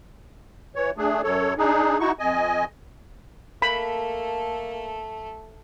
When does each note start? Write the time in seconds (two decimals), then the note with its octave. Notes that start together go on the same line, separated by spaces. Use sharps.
0.76 E3 C#5
0.98 A3 D4 G#4
1.24 F#2 A4 C#5
1.58 D4 D#4 G#4
2.00 D#4 E4 F#4 C#6
2.19 F2 D#5 G#5
3.62 A3 A#3 A4 B5